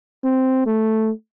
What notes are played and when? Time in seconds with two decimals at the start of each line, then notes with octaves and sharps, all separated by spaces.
0.24 C4
0.66 A3